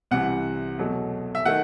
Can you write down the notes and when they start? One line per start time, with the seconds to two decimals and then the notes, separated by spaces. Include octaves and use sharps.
0.11 C2 C3 E3 F#5
0.78 E2 B2 F#3 A3
1.35 E5
1.46 D#3 A3 F#5